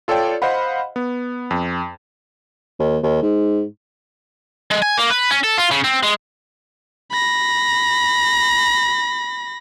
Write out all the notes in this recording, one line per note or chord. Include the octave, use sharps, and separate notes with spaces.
F4 A4 C#5 D5 G5
C5 D#5 F5 F#5 B5
B3
F2
D#2
D#2
G#2
G#3
G#5
A#3
B4
C#4
A4
F4
C#3
C4
G#3
B5 A#6